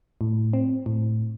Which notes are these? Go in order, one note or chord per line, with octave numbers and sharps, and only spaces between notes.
A2
C4
A2